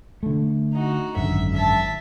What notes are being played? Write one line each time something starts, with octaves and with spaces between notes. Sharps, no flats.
D3 A3
D#4 F#4
G#1 F#2 D3 E5
E5 A5